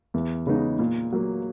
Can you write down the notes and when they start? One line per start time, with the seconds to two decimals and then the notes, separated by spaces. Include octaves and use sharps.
0.14 E2
0.47 C#3 G#3 B3 D#4
0.79 A#2
1.12 F#3 A#3